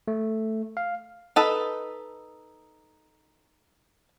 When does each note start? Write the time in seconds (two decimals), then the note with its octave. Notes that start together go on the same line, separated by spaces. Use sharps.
0.08 A3
0.77 F5
1.36 D#4 A4 B4